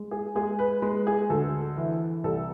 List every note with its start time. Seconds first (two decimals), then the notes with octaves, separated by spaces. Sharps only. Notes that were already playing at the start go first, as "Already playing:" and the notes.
Already playing: G#3
0.11 G#4
0.35 G#3 G#4
0.59 B4
0.82 G#3 B4
1.07 G#4
1.30 D2 A4
1.77 E3
2.24 C2 A4